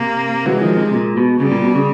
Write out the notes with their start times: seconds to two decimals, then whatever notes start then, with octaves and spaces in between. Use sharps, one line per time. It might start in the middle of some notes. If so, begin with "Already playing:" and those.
Already playing: C3 A#3
0.45 E3 F#3 G#3
0.61 D#3 F3
0.77 C3
0.93 A#2
1.17 B2
1.40 C#3 G3
1.51 A#2
1.64 B2
1.75 C#3